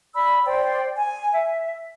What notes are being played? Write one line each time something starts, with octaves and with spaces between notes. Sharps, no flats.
D5 B5 E6
C5 D5 G5
G#5
E5